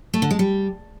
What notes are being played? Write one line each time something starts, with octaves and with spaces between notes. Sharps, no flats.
A3
D3
G#3
G3